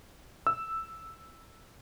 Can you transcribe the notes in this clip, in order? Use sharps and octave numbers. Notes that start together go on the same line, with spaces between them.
E6